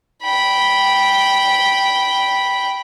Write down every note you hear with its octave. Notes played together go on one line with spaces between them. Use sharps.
G5 B5